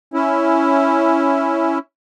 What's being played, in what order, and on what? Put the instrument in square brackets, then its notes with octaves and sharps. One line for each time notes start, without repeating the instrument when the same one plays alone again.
[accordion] C#4 E4